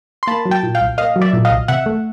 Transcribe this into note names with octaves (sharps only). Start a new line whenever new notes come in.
C6
A#3 A5 B5
F#3
G5 A5
A#2
F5 G5
C2
A#3 D#5 F5
F#3
D5 E5
A#2
D#5 F5
C2
C3 E5 F#5
A3